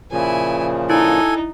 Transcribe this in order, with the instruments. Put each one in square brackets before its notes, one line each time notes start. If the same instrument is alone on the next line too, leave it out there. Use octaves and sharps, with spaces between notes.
[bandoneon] A#2 C#3 F3 [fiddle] E4 G#5
[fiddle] D#4 [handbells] E4 [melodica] A4 G#5